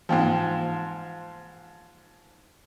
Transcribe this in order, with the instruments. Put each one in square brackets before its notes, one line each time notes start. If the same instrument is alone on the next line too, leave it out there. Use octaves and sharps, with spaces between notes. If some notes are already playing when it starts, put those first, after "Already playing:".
[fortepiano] G#2 F3 [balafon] E3 A#3 G5